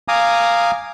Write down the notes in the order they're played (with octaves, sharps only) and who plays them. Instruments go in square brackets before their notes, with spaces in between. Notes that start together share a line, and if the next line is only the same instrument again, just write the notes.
[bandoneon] F5 G#5 A#5 D6 D#6